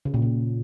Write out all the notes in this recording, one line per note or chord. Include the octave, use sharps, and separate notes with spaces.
C#3
A#2
C#3